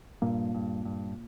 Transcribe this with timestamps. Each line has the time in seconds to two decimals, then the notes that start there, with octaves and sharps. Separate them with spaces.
0.22 G2 A#2 A#3
0.55 G2
0.85 G2